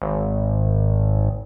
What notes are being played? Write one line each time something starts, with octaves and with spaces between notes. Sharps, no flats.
G#1